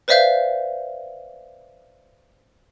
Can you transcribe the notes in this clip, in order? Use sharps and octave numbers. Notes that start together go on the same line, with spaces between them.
B4 C5 D5 E5 F5 G6